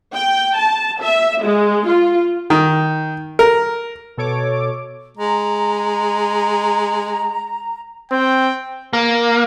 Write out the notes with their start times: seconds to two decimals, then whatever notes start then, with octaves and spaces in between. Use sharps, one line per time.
0.14 G5
0.56 A5
1.02 E5
1.42 G#3
1.87 F4
2.50 D#3
3.39 A#4
4.17 B2 A4 C#5 D6
5.17 G#3 A#5
8.12 C4 G5
8.93 A#3